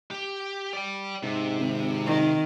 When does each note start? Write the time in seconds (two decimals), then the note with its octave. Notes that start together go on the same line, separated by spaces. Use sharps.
0.11 G4
0.73 D5 G5
1.23 G#2 C3
1.59 G#1
2.07 D#3